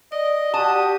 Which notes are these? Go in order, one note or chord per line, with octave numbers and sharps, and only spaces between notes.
D5 D#5
F#4 G4 A5 D#6